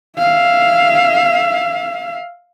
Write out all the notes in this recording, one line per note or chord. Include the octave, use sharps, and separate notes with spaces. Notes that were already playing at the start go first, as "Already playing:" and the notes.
E5 F5